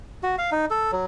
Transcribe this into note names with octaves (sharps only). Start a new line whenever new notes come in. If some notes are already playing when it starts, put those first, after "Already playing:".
F#4
F5
D#4
A4
F#3